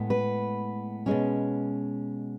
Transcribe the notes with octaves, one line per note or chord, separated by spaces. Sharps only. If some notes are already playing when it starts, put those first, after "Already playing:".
Already playing: A2 G#3 B3
B4
B2 G#3 C#4